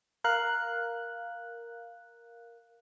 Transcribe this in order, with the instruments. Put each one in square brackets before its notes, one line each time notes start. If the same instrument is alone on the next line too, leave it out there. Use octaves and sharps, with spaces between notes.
[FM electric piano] A#4 F5 F#6